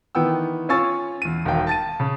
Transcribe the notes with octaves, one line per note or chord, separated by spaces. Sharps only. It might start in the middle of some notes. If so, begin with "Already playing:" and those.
D#3 E3 B3 G5 E6
C#4 F4 G#5 C#6 E6 A6
E2 D#7
E1 D#3 F5 G5
A5 A6 D#7
C#3